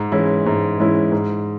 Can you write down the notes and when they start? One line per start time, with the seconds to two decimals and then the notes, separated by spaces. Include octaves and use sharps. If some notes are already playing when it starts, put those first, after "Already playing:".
Already playing: G#2
0.12 E3 G#3 C#4 E4
0.46 G#2
0.79 E3 G#3 C#4 E4
1.12 G#2